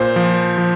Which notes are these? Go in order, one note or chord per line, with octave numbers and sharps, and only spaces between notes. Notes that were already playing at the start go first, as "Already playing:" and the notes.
Already playing: A#2 C5
F3
F3